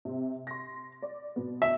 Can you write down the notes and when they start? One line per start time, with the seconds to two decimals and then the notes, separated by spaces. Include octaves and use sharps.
0.05 C3 C4
0.47 C6 A#6
1.02 D5
1.36 B2 B3
1.62 E5